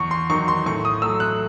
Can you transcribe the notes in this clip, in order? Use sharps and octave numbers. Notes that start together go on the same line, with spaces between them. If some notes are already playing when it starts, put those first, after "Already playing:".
Already playing: E2 C#6
C6
D#3 F#3 C#6
C6
A2 C#6
D#6
F#3 A3 E6
F#6